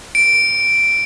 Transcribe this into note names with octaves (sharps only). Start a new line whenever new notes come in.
D7